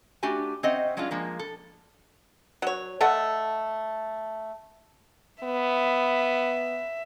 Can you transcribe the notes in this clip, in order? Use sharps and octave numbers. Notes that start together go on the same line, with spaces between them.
A3 D4 F#4 G4 G#5
C4 C#4 C5 D#5 E5 F#5
F#3 G#3 C#4 D4 F4
F3 G#3 A#3
A4
F#3 C#5
A3 A4 D#5 F#5
B3 E5